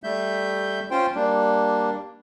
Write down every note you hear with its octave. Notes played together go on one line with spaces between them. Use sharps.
G3 A3 E5 G6
C#4 F4 C5 G5 C6
G3 A#3 D4